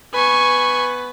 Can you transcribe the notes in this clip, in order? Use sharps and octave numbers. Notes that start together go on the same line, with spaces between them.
B3 B4 G#5 C#6